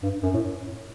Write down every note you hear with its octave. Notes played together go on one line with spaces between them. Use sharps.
G2
F#2
A2